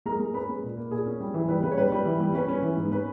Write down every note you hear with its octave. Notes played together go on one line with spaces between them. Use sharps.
G#3 A#4 A#5
G#3
C#4 B4 B5
G#3
A#2
A#3
A#2 G#4 G#5
C#4
G3
E3
G3 B4
C#3 B4
C#5
G3 B4
G3
E3
G3
C#4 B4
C#4
E3
G#2
C#4 B4